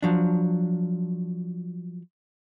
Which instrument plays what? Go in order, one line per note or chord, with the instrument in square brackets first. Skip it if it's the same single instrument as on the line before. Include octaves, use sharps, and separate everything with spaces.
[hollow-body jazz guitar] F3 F#3 D4